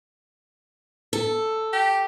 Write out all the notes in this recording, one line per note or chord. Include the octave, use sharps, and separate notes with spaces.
A4
G4